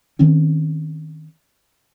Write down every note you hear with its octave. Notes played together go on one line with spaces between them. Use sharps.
D#3 C4 C#4